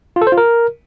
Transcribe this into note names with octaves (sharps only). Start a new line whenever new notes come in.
F4
A4
C5
F4
A#4